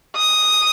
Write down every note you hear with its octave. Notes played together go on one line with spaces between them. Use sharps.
D#6